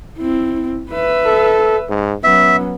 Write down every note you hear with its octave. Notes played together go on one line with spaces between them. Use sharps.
C4 E4
B4 E5
A4
G#2
F#3 B3 C#4 E5